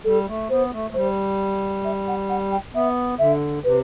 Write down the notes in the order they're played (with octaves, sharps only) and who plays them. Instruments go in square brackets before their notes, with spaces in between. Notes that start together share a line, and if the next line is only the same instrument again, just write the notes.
[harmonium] G3 [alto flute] A4
[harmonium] A3
[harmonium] B3 [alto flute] C5
[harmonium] A3
A3
[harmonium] G3 [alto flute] C5
[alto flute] E5
F#5
F#5
G5
[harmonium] B3 [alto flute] E5
[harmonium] D3 [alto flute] E5
[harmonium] C3 [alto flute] B4